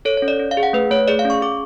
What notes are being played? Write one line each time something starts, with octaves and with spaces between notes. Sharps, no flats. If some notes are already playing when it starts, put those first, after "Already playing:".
A4 C#5
C#5
C#4
D5
C#4
F5
G#4
F#5
A3 B4
A3 C#5
G#4 D5
F5
C#4
C#6
G#4 D6